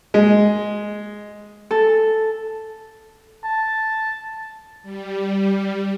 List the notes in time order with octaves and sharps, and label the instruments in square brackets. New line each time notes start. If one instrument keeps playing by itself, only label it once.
[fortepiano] G#3
[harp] A4
[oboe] A5
[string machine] G3